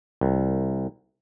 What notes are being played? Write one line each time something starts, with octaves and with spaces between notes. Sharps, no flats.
C2